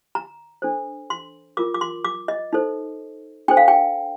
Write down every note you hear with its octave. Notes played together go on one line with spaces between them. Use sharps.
A#5
D4 A4 C5
C6
F4 A#4 D6
D6
C6
D6
D#5
D#4 A4 C5
D4 A4 C5 G5
F5
G5